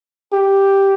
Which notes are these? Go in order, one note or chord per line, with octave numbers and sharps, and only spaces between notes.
G4